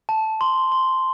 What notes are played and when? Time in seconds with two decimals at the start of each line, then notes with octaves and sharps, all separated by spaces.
0.09 A5
0.41 C6
0.72 C6